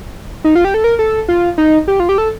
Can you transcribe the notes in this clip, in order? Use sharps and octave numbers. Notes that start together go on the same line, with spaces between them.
D#4
F4
G4
A4
A#4
A4
F4
D#4
G4
F4
G4
A4